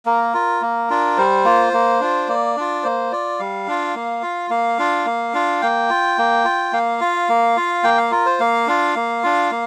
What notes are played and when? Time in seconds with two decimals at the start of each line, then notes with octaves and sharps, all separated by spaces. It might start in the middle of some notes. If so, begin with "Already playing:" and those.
0.06 A#3 A#4
0.34 F4
0.61 A#3
0.90 D4 F4
1.18 G3 C5
1.45 A#3 F4
1.73 A#3
2.01 D4 F4
2.28 A#3 D5
2.57 D4 F4
2.83 A#3 C5
3.12 F4 D5
3.39 G3 F5
3.68 D4 F4
3.95 A#3
4.23 F4
4.50 A#3 F5
4.79 D4 F4
5.06 A#3
5.34 D4 F4
5.62 A#3 G5
5.90 F4
6.18 A#3
6.45 F4
6.73 A#3 F5
7.01 F4
7.29 A#3
7.57 F4
7.84 A#3 G5
7.97 F5
8.11 F4 A#4
8.26 C5
8.40 A#3 F5
8.67 D4 F4
8.96 A#3
9.24 D4 F4
9.51 A#3